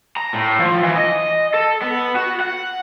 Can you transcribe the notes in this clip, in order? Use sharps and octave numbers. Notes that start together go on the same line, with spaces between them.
A#5
A2
F3
E3
D#5
A4
B3
F#4
F#5